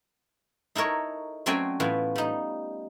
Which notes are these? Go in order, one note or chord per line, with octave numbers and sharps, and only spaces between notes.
D#4 E4 A4 A#4 C#5
F#3 A3 C4 C#4 D5 G#5
A2 E3 B3 E4 F4
G3 D#4